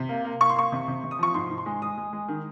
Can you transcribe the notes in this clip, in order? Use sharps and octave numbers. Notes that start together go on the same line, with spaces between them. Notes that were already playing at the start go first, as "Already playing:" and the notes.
Already playing: C3
A#3
A#3
A#3 C#6
C6
A#3 C#6
C3
C3
C3
D#6
F3 C#6
G#2 C6
G#2
C6
G#3
G#3 D#6
G#3
G#3
D#3